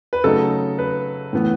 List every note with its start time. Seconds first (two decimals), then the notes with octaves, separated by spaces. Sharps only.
0.13 B4
0.24 C#3 F#3 A3 D#4 A4
0.79 B4
1.33 A2 E3 B3